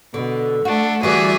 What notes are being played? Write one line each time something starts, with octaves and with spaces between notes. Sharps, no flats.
B2 D3
A3 D4 F#4 A4
D3 E3 G3 F#4 G#4 D5 E5